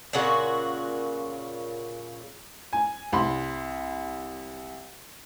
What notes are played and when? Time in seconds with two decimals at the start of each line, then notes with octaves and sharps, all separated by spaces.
0.13 A#2 C#3 F#4
2.73 G#5
3.12 C2 B5 C6